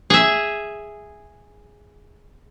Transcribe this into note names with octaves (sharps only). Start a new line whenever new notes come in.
G#4 E5